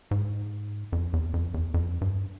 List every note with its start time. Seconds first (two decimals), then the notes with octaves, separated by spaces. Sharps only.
0.11 G#2
0.92 F2
1.13 E2
1.34 F2
1.54 E2
1.74 F2
2.01 G2